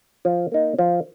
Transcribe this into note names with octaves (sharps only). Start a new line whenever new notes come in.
F3
A#3 D#4
F3